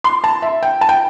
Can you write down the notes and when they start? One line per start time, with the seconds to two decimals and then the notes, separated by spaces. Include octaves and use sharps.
0.04 C6
0.24 A5
0.42 E5
0.63 G5
0.81 A5
0.89 G5